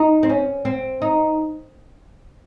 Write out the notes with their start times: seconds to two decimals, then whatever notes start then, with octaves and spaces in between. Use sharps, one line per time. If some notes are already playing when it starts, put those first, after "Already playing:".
Already playing: D#4
0.23 C4
0.29 C#4
0.65 C4
1.02 D#4